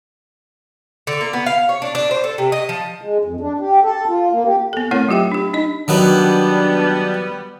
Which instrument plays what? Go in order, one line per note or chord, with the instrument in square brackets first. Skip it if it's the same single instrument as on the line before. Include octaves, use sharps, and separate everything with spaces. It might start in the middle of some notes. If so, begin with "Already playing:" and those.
[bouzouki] D3
A#3
B3
F5
C#5
D4
D4
C5
A4
C3
D#5
F3
[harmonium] G#3
F2
D4
G4
A4
F4
A#3
G4
[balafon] B3 A4
A3 C4 E4 A#4 C#5 F#5
F#3 F4 G4 E5 G5
D4 G4
D4 D#4 D#5
[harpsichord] D#3 F#3 B4 [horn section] G3 B3 [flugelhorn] D4